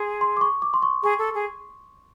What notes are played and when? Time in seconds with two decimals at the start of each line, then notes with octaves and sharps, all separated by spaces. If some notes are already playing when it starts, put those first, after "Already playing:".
Already playing: G#4 C6
0.21 C6
0.37 D6
0.41 C#6
0.62 D6
0.74 C6
0.82 C#6
1.03 G#4 C#6
1.18 A4
1.34 G#4